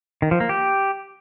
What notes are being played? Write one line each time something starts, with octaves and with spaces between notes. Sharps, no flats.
D#3
F3
A#3
G4